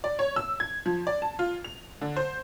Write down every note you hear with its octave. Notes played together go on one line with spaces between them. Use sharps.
D5
C#5
E6
G#6
F3
D5
A5
F4
F7
D3
C5